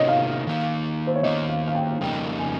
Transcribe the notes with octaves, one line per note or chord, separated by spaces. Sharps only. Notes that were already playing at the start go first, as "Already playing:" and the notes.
Already playing: C3 D#3 A#3 D#4 C#5 D#5
F5
D#3 A#3 D#4
C5
C#5
D#3 A#3 D#4 D#5
F5
F5
G5
F2 C#3 G3 A#3 D#4 G5
G#5